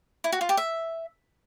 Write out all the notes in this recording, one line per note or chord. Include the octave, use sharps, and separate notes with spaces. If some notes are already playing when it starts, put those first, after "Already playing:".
E4
F#4
F4
G4
E5